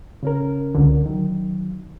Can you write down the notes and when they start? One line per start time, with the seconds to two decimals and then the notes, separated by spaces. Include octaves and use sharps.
0.23 C#3 C#4 A#4
0.75 C#2 D3
1.06 D#3 F#3